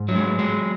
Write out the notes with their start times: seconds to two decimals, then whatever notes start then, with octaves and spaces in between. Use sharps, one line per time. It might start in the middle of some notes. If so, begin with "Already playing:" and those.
Already playing: G#2
0.08 F#3
0.15 G#3
0.39 F#3 G#3